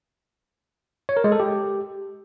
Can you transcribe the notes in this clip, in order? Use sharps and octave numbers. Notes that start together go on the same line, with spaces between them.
C#5
A#4
G#3
A4
G4